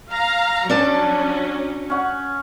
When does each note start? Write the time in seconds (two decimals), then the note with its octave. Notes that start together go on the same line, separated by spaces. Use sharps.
0.11 F5 A#5
0.70 F#3 C#4 D4 D5 A5
1.90 C#4 F#5